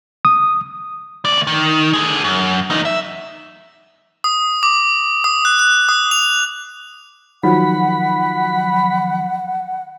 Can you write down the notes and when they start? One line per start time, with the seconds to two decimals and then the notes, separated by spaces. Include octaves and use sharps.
0.25 D#6
1.25 D2 D5
1.47 D#3
1.93 D3 G#4
2.24 F#2
2.70 E2 D#4
2.85 E5
4.24 D#6
4.63 D6
5.24 D#6
5.45 F#6
5.59 F#6
5.89 D#6
6.11 F7
7.43 D#3 F3 F#3 F#5 B5